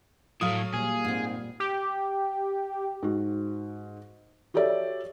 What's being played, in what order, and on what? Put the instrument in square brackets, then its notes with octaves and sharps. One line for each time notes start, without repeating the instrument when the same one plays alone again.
[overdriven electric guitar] A2 A3 [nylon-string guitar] F#3 [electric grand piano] F5 D#6
[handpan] A#2 G3 [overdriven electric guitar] G#4
[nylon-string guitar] G#2 C4
[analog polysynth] G4
[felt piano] G#2 F#4
F#4 G4 A4 C#5 D5 E5